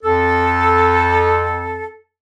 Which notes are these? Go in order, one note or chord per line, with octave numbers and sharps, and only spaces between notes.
F2 A4